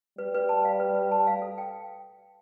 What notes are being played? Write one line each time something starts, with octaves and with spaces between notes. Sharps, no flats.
G3 B4
B4
A5
F5
B4
B4
A5
F5
A4
G5